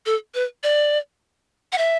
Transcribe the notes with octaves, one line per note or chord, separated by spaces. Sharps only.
A4
B4
D5
F#5
E5